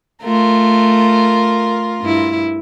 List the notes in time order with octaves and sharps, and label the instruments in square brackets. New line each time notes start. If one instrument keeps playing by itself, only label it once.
[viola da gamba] A3 [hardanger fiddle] F4 A#4
[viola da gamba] G2 E4